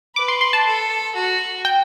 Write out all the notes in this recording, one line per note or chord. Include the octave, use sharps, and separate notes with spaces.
B4 D6
C6
C6
A5
A4
F#4
G5